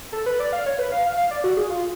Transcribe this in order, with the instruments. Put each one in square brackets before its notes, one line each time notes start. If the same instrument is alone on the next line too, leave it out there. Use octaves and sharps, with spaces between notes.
[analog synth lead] A4
B4
D5
F5
C#5
B4
F5
F5
F5
D5
F#4
G#4
F4